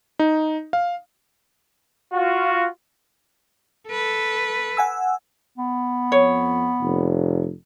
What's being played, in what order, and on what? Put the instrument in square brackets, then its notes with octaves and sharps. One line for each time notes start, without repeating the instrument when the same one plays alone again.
[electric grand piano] D#4
F5
[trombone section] F4 F#4
[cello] A4 B4
[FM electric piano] F#5 G#5 E6
[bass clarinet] B3
[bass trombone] F2 [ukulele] C#5
[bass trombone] F1